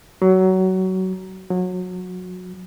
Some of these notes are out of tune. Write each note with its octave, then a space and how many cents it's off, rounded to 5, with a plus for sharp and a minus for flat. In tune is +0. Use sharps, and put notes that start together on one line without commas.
F#3 +20
F#3 -25